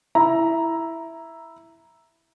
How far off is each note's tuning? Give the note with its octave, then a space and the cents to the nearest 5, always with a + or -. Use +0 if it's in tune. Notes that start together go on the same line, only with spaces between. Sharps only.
E4 +0 A#5 +5